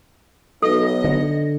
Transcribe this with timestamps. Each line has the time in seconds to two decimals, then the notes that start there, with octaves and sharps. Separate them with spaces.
0.62 B1 A4 D#5
1.04 D3